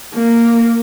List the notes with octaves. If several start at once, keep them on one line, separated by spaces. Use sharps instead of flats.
A#3